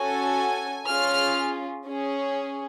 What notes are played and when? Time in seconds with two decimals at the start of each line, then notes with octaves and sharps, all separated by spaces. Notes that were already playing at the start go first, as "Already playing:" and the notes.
Already playing: C#4 F#4 A4 G#5
0.87 C#4 F4 G#4 F6
1.87 C#4 G#4